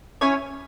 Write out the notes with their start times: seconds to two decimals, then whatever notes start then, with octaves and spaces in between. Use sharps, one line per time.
0.21 C#4 E4 C#5 G#5